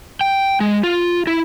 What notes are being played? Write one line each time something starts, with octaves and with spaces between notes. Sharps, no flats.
G5
G#3
F4
E4